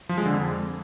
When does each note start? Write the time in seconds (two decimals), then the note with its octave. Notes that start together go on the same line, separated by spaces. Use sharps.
0.09 F3
0.17 G#3
0.26 D3
0.34 F2